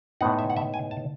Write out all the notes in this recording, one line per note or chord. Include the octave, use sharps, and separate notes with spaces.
A2 G#3 B3 D#4 F#5
E5
F#5
E5
G#5
A5